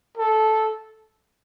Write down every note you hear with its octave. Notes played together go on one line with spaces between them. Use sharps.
A4